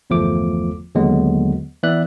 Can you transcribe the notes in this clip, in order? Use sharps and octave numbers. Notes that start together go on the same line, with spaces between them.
G1 E2 F3 A3 D6
D#2 D3 F#3 G#3 B3
E3 B3 D5 E5 F#6